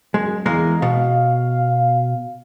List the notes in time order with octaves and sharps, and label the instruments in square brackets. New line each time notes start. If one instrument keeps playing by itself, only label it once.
[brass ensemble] F#2 [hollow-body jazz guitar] G#3
[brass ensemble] E2 [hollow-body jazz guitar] G#3 A#3 A#4
[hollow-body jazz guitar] B2 [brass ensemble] F5